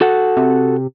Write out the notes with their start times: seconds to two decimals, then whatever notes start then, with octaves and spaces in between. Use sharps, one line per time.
0.01 F#4 A4 F#5
0.37 C3